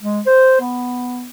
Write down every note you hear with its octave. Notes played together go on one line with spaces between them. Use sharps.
G#3
C5
B3